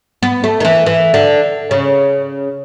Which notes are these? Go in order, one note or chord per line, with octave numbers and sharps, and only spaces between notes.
B3
A3
D#3
E3
E3
D3
C#3